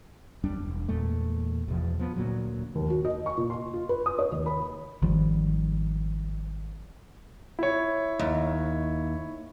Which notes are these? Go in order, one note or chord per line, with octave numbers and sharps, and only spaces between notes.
F#2 G3 D4
E1
E2 A#2 G#3 A3
E2 B2 F3
F3 B3
D2 A#2 F#3
D#2
F#4
D#5
C#6
A#2
C6
F4
B4
D#6
C#5
D#2
B5
G#1 D#3 F3 G3
E4 C#5
D#2